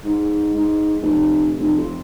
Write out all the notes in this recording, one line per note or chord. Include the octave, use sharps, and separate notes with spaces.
G#2
G#2
F1
F1
F2